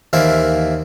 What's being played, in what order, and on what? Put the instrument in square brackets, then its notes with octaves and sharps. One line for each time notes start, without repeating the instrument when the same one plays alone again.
[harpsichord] D#2 E3 A#3 E4 C5 D5